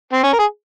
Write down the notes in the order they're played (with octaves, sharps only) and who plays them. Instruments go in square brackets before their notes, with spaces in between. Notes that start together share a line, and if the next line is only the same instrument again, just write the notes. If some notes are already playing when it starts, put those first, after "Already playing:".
[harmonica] C4
C#4
A#4
G#4